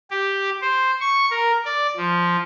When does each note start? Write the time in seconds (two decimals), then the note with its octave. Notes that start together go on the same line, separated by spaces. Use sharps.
0.11 G4
0.62 C5
1.01 C#6
1.31 A#4
1.65 D5
1.97 F3